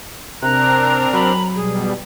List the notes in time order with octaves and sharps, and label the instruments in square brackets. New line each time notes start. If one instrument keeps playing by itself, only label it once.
[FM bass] C3 [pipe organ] C4 D4 A#4 [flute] A#5 [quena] F#6
[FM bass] F#3 [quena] B5
[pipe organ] B2 G3 [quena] G#4